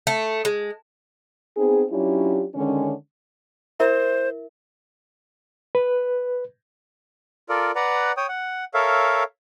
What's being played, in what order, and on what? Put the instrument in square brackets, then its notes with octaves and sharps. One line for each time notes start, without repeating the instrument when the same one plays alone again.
[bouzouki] A3
G#3
[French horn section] B3 C4 D#4 G#4
F#3 C#4 D4 E4 F4 G4
D3 D#3 G#3 C#4
[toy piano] E4 A#4 E5 [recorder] C5
[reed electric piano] B4
[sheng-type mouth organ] F4 A4 A#4 D5
B4 D5 F#5 A#5
C#5 G5 D#6
F#5
A4 A#4 C#5 E5 F5